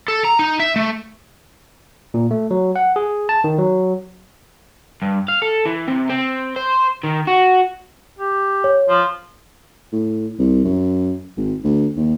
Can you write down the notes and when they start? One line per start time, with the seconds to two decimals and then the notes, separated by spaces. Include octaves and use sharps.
0.08 A4
0.25 A#5
0.39 D#4
0.60 E5
0.76 A3
2.14 A#2
2.31 A3
2.51 F#3
2.76 F#5
2.96 G#4
3.29 A5
3.44 D#3
3.58 F#3
5.02 G2
5.28 F5
5.42 A4
5.66 E3
5.88 C3
6.10 C4
6.56 C5
7.04 D#3
7.27 F#4
8.19 G4
8.64 C#5
8.89 F3 F4
9.93 A2
10.39 C2
10.64 F#2
11.37 G#1
11.64 D2
11.97 D#2